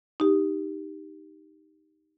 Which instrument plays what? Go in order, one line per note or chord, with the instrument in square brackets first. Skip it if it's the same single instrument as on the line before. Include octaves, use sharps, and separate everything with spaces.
[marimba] D#4 G4